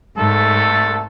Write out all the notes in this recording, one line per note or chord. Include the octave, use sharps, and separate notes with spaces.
C2 G#2 A3 A4